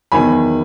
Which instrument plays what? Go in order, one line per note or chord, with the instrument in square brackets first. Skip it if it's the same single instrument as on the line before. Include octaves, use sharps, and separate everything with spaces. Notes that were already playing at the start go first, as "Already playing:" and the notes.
[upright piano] E2 D#3 F#3 G#5 B5